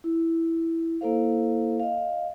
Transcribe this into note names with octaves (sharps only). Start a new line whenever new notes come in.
E4
A#3 E4 A4 C5 F5
D#5 F5